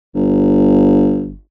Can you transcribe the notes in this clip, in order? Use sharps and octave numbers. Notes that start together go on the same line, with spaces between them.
G1